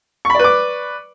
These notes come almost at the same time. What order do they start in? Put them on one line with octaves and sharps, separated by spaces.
C#6 B5 D5 B4 D6